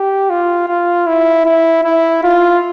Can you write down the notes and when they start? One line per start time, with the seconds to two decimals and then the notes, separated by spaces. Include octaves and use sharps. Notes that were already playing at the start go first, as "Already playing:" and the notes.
Already playing: G4
0.30 F4
0.68 F4
1.07 E4
1.46 E4
1.84 E4
2.23 F4